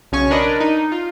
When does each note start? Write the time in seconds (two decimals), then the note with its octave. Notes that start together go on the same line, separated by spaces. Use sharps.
0.12 B1 C#3 C#4 C#5 G#5 C#6
0.31 D4 A#4 B4 D5 D#5
0.60 D#4
0.92 F4